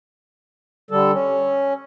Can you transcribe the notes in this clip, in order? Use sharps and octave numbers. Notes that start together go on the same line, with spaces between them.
D3 G3 A4
C#4